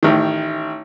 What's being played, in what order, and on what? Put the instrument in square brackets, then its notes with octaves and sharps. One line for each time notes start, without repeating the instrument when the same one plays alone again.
[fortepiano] A1 D#3